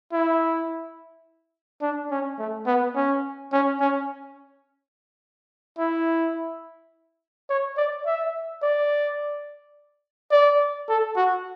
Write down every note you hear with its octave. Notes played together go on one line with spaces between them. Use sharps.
E4
D4
C#4
A3
B3
C#4
C#4
C#4
E4
C#5
D5
E5
D5
D5
A4
F#4